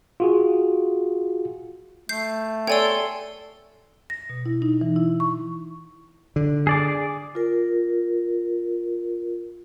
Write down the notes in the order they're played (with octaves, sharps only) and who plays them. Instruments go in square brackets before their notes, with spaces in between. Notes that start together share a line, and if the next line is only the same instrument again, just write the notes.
[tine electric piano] F4 F#4 G#4
[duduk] A3 [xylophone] G6 C7
[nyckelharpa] A4 C6 [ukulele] C#5 D5 [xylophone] G5 G#5 E6
[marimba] A#6
B2
E4
D#4
E3
E4
C#6
[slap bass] D3
[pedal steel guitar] G#4 D5 D6
[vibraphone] F4 A#4